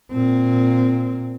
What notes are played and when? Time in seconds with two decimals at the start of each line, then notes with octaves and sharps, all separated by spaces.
0.12 A#2 C4